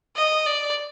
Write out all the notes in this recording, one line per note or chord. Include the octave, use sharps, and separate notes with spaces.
D#5
D5